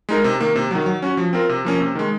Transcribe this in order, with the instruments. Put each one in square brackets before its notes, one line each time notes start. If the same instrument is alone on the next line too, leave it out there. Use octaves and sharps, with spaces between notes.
[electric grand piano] G#3 D#4 A#4
C3
D#3 A#3
C3
D#3 F#3
F#3
C#4 F#4
F3
C4 F4 A#4
C3
F3 A#3 C#4
C3
D#3 G#3